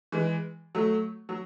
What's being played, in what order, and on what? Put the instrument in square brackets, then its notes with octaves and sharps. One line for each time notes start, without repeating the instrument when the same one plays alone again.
[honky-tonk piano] E3 G#3
F#3 A3
F#3